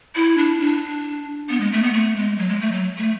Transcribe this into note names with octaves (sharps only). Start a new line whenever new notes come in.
E4
D4
D4
B3
G#3
A3
B3
A3
G#3
F#3
G#3
A3
F#3
A3